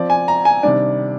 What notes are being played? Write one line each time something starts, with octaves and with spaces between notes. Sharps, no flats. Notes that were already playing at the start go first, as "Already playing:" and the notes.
Already playing: F3 C4 D5
G#5
A#5
G#5
C3 D#3 G3 D4 D5